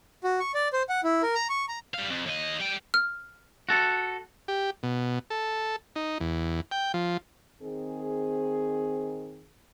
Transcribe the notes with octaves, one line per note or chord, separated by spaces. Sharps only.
F#4
C#6
D5
C5
F#5
E4
A#4
A#5
C#6
A#5
G3 F5
F2
D#2 D#5
G3 G5
F6
F#4 A4
G4
B2
A4
D#4
E2
G5
F3
D#3 C4 G#4